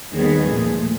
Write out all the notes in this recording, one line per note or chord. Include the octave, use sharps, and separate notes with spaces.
D#2 D#3 G3 B3 G#4
A#2 F3 A3